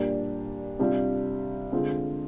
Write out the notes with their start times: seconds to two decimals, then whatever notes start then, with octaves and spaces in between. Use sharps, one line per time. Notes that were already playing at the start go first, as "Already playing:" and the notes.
Already playing: A#2 G3 D4 G4
0.79 C3 G3 D4 F4
1.72 D3 G#3 C4 F4